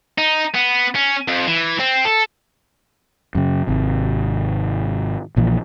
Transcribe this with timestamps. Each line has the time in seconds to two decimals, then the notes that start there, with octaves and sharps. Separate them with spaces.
0.18 D#4
0.55 B3
0.95 C#4
1.28 F2
1.47 E3
1.79 C4
2.05 A4
3.35 F#2 C#3
3.67 G#1 C3
5.36 A#1 A#2 E3 F3